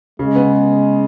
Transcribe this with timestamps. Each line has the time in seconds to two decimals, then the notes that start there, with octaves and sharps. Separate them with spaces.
0.19 C#3 G#3
0.35 B3